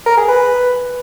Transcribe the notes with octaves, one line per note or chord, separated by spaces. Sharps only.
A#4
G#4
B4